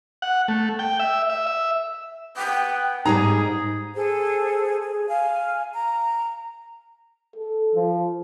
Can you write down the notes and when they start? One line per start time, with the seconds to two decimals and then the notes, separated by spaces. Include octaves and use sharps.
0.22 F#5
0.48 A3
0.79 G5
1.00 E5
1.30 E5
1.47 E5
2.37 B3 G5
3.05 G#2 G3 D#4 G#4 A#5
3.94 G#4 A4 C5
4.79 G#4
5.08 F5 G#5
5.72 A#5
7.36 A4
7.75 F3